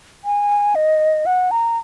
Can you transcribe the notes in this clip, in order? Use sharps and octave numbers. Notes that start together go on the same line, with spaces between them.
G#5
D#5
F#5
A#5